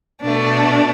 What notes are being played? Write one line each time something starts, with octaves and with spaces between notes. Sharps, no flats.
B2 A3 D4